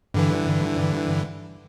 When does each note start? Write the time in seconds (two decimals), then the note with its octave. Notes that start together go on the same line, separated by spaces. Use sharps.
0.14 G2 D3 E3